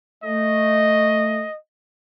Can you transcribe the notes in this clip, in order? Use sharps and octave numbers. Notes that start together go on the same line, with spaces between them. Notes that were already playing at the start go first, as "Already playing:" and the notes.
A3 D#5